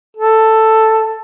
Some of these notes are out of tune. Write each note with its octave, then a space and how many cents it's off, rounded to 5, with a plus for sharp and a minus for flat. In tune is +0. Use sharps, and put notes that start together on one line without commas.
A4 +5